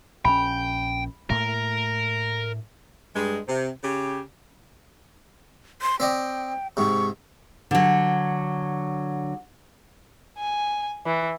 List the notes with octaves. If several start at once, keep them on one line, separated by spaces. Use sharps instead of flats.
A#1 D#3 C#4 G5 B5
A2 A3 A#3 A#4
G2 G#3
C3
C#3 G4
C6
C4 D5 D#5 G5
G#2 C3 C#6
D3 F#3
G#5
E3